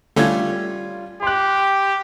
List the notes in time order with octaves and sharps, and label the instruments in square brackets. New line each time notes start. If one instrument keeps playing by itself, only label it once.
[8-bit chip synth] D3 A3 C#4 [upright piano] G3 F4 G#6
[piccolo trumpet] G4 [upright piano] C6 F#6